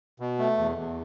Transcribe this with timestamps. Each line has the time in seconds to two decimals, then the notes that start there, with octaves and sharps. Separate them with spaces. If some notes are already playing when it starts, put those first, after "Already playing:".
0.20 B2
0.39 A3
0.58 E2
0.77 E2